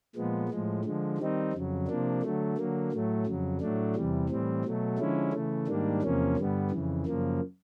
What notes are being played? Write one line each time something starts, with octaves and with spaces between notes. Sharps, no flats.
A#2 F3 G#3 B3
A2 F3 G#3
D3 F3 G#3
D#3 G3 C4 D#4
F2 C#3 F#3
C3 F3 A#3 D4
D3 F#3 A3
D3 F#3 A#3
A2 F#3 A3
F2 C#3 F#3
A2 F#3 A3 D4
E2 C3 E3 G3
A2 E3 G3 C4
B2 F#3 A3
D3 F3 G#3 C#4 E4
C#3 E3 A3
G#2 D#3 G3 A#3 D4
E2 C3 F3 A#3 C#4
G2 D3 G3 B3
F2 C#3 E3
F#2 C#3 F3 A#3